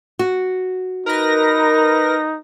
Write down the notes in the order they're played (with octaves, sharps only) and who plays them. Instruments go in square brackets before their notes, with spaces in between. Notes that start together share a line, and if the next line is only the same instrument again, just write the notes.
[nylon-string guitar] F#4
[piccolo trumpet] D#4 [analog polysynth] A#4 B4 A#6